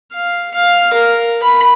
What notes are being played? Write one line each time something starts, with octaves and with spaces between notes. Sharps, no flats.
F5
F5
A#4
B5